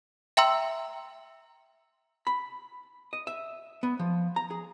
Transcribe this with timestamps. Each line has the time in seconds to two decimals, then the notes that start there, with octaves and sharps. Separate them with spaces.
0.37 E5 G5 A#5 C6 E6
2.27 B5
3.13 D#5
3.27 E5
3.83 B3
3.99 F3
4.36 A#5
4.51 G#4